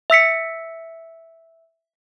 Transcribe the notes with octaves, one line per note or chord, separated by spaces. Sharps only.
E5 E6 B6 C#7